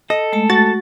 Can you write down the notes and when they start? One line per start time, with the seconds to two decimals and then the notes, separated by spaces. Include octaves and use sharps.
0.10 A4 D#5
0.33 G#3 A3 A5
0.50 F#4 A6